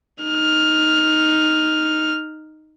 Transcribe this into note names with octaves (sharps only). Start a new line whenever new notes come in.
D#4 F6